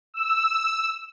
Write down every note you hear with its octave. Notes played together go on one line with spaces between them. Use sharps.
E6